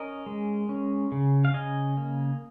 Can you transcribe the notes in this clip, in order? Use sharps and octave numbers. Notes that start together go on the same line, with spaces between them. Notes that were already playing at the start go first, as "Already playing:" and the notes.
Already playing: C#4 A#4 D#5
G#3
C#4
C#3
F5
C#3 D#5 G#5
A#3